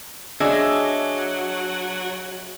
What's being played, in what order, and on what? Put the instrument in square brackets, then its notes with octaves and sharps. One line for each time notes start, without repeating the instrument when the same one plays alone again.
[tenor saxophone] F#3 [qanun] D4 [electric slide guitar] G#4 D#5 E5